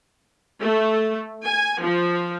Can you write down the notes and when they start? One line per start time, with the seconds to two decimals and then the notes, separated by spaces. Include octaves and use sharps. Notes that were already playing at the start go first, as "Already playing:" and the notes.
0.61 A3
1.46 G#5
1.81 F3